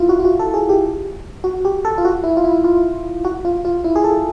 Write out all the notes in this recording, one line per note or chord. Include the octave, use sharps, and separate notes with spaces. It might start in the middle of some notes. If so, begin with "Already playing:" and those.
Already playing: E4 F4
F#4
F4
F#4
A4
G#4
G4
F#4
G4
A4
F4
F#4
E4
F4
E4
F4
F#4
F4
F4
E4
G#4
A4